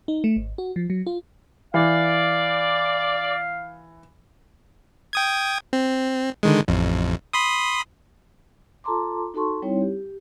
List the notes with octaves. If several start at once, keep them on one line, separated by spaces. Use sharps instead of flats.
D#4
A3
G#1
F#4
F3
F#3
F4
E3 D5 F5
G5 D#6 G#6
C4
D3 D#3 G#3
A1 F2
B5 C6 D#6
F4 A4 A5 A#5 C6 D6
D#4 F#4 A4 A5 C6 C#6
G3 C4 D#4 E4 C#5
G4